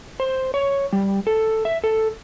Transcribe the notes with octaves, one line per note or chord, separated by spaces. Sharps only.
C5
C#5
G3
A4
E5
A4